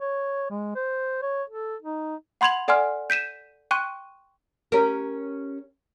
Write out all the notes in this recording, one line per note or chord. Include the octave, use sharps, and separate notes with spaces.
C#5
G#3
C5
C#5
A4
D#4
F#5 B5 C6 G#6 F7 F#7
A4 D5 F#5 G#5 C6 F6
G6 B6 D#7 E7
G5 C6 C#6 F#6 D#7
C#4 G4 A#4